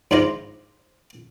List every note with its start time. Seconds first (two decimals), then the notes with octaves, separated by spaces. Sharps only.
0.11 G#2 D4 E4 F4 C5 A#5